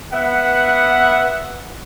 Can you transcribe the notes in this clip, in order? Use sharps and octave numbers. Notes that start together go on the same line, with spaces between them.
B3 E5 F#5